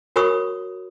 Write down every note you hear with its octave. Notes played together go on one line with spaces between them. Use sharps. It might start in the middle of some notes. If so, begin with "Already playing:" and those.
F#4 A#4 C#5 B5 C#6 D#6